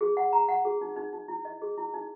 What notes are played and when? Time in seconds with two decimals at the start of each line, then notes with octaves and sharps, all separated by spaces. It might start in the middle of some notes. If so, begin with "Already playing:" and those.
0.01 G#4
0.17 F#5
0.33 A#5
0.48 F#5
0.65 G#4
0.81 D#4
0.96 D#4
1.13 D#4
1.28 E4
1.45 D#5
1.62 G#4
1.78 E4
1.94 D#4